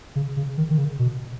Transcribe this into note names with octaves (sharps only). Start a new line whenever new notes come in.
C#3
C#3
D#3
D#3
C#3
B2